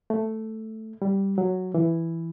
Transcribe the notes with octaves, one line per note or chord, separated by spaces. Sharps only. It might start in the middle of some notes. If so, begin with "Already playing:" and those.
A3
G3
F#3
E3